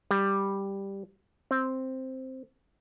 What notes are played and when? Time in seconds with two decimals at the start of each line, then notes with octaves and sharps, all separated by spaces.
0.11 G3
1.51 C4